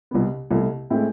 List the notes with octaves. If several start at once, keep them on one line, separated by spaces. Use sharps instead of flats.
C2 B2 B3
C2 B2 A3 E4
A2 G#3 C4 E4